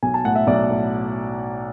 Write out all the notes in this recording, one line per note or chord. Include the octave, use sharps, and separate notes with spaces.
B1 G#5
A5
A2 F#5
E5
B1 D5
A2